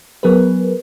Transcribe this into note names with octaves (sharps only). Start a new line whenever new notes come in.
F#3 B3 G#4 A#4 B4